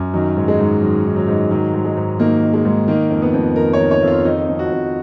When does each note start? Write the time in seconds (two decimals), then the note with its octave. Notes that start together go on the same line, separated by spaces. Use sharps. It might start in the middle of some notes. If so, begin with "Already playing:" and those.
Already playing: F#2
0.14 D#3 F#3
0.36 G#2
0.48 G#3
0.59 G#2
0.82 D#3 F#3
1.05 D#3
1.16 F#3
1.28 G#2
1.51 D#3 F#3
1.73 G#2
1.85 G#3
1.97 G#2
2.19 D#3 A#3
2.42 D#3
2.53 G#3
2.65 G#2
2.88 D#3 A#3
3.10 F2
3.22 B3
3.34 F2
3.56 D#3 A#4
3.73 C#5
3.79 D#3
3.91 C#5
4.02 F2
4.08 F4
4.25 D#3 D#4
4.48 F2
4.59 F#4
4.71 F2